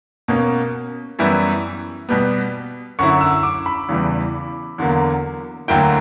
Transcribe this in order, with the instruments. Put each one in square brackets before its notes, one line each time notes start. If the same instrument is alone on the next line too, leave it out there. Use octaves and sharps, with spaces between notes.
[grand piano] B2 A#3 C#4
F#2 E3 G3 B3 E4
B2 G3 B3
F#2 D3 F#3 C#4 E4 C#6
E6
D6
B5
E2 C#3 E3 G3
E2 D3 F#3 A#3
D2 D3 F#3 A#3 E4 G5